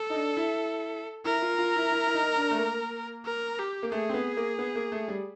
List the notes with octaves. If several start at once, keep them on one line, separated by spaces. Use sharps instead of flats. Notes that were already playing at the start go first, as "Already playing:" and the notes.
Already playing: A4
D#4
D4
E4
E4 A#4
F4
F4
E4
E4
E4
D#4
D4
A3
A#3
A#4
G4
A#3
A3 G#4
C4
B3
A#3
B3
A#3
A3
G3